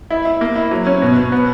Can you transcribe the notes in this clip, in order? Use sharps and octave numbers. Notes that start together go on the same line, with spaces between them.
E4
E4
A#3
E4
F#3
C#4
B2
B2
B3